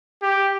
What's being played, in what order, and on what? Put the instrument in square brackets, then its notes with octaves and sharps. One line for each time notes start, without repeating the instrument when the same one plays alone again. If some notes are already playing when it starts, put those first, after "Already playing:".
[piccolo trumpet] G4